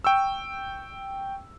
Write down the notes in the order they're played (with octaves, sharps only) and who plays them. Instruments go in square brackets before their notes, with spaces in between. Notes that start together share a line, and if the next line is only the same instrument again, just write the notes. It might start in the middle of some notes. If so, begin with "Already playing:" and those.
[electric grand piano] G5 C#6 E6